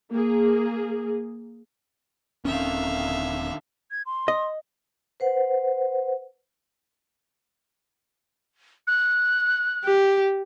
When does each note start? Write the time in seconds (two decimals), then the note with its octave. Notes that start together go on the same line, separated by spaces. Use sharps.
0.11 A#3 G#4
2.45 D#1 D3 D#3 C4 C#4 E5 F5
3.91 G#6
4.06 C6
4.28 D#5
5.20 B4 C5 F#5
8.87 F#6
9.85 G4